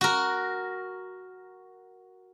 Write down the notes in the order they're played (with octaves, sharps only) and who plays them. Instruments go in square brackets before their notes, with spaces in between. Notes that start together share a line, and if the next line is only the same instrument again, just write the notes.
[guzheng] F#4 A#4